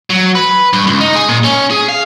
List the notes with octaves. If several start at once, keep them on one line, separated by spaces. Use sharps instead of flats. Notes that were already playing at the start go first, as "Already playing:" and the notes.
F#3
B4
G2
C#2
D#4
G#4
A#2
C#4
G#4
F5